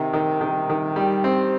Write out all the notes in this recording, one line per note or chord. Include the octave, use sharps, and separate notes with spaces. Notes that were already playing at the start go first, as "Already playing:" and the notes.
Already playing: C3 D#3
D#3
D#3
D#3
G3
C4